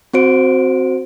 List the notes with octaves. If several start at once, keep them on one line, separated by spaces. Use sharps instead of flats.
C4 F#4 C5 D7